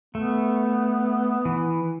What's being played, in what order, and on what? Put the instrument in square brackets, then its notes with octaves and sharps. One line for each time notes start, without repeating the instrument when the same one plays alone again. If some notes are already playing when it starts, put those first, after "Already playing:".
[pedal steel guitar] A3 [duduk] B3
[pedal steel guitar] E3